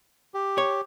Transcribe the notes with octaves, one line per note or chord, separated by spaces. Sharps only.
G4
C#5